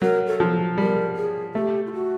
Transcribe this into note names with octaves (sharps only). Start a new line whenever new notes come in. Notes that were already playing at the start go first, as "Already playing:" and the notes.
F#3 A#4
A4
F3
G3 A#4
G#4
A3 G4
F4
F#4